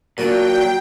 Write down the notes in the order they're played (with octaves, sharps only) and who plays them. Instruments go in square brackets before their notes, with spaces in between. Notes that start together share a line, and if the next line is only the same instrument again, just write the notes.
[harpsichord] A#2 A#3 D4 [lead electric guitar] F#3 [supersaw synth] G5